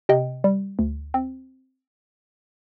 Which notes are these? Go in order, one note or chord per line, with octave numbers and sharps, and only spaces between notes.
C3 D#5 G5
G3
D2
C4